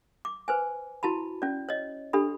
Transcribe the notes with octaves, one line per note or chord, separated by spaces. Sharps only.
D6
B4 C5 G#5
E4 F#4 A5 B5
C#4 D5
C#5 D#5
D4 G4 A4 B5